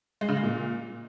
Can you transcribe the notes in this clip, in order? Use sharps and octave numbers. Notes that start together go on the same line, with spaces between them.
G#3
C#3
G#3
A#2